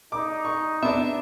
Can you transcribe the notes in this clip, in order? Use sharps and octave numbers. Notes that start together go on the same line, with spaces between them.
D#4 D6
C#6
B3 D4 E5